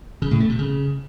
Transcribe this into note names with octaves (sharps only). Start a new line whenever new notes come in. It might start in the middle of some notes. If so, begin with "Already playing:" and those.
C#3
A2
A3
C3
C#3